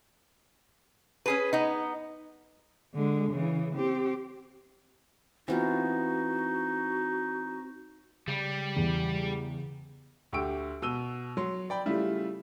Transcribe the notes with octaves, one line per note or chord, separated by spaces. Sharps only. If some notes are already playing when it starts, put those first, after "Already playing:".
C#4 G#4 B4
B3 D#4
D3 G#3
C#3 E3
C4 G4
E3 B3 C4 D#4 F4 F#4
C#3 G3
E2
D2 G4 G5 C#6 E6 D7
B2 E6 D#7 G7
F#3 C6
D5 G5 B5
C#3 G3 A3 E4 F4